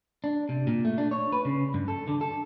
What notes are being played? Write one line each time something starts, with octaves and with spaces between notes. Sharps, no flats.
D4
C3
A#2
A3
D4
C#5
B4
C#3
G2
A4
D3
A4